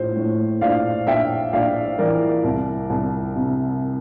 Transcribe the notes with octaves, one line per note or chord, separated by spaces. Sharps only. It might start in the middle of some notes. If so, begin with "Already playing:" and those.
Already playing: A#1 A2 C5
A2
A#1 D5 F5
A#1 E5 G5
A#1 D5 F5
E3 A#4 D5
C2
C2
C3